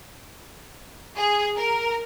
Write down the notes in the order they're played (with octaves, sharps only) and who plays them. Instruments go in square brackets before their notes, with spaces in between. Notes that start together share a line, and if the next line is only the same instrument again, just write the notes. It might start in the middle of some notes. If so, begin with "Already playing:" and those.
[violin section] G#4
A#4